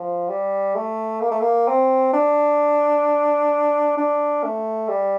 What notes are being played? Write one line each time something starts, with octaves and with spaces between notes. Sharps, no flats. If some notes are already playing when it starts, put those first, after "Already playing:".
Already playing: F3
G3
A3
A#3
A3
A#3
C4
D4
D4
A3
G3